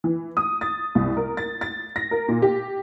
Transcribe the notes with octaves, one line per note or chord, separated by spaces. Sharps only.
E3
D#6
A6
C2
A#4
A6
A6
A#6
A#4
A#2
G4